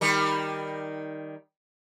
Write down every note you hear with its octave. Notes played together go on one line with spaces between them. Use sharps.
D#3 G3 A#4